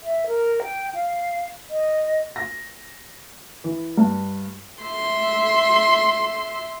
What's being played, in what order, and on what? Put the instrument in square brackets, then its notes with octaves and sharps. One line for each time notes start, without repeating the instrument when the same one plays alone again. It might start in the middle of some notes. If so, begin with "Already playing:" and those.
[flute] E5
A#4
G5
F5
D#5
[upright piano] A#6
E3
G2
[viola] E5 C6